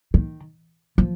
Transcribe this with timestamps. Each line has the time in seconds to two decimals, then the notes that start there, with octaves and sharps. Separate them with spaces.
0.14 D#3
0.98 F3